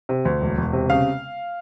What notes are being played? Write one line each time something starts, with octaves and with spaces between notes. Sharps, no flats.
C3
D2
E1
E1
C3
C#3 F5